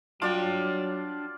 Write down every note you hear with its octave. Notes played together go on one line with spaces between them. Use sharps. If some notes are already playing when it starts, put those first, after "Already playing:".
F#3 D4 F4 D5 F#5 G5